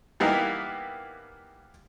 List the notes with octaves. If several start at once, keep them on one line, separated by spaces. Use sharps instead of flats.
E3 G3 A#3 B3 D#4 E4